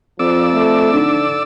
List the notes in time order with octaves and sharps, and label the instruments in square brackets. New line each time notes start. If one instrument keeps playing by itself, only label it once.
[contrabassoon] F2 [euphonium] F3 [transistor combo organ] D5 E6
[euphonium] A3
[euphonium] D3 [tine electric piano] D4 D#4